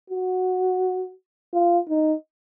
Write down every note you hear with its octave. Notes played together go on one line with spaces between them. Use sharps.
F#4
F4
D#4